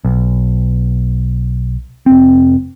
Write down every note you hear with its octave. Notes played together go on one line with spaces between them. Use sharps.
B1
F1 C4